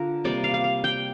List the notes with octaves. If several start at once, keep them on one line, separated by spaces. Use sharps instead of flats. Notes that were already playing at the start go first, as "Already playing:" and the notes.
Already playing: D3 F4 A#4
C3 G3 A#3 D5
F5
F5
F5
G5